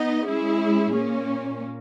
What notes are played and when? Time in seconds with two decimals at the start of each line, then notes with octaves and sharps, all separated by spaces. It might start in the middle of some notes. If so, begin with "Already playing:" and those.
Already playing: B3 D#4 D#5
0.27 G#3 C#4 E4 G#4
0.95 A#2 A#3 C#4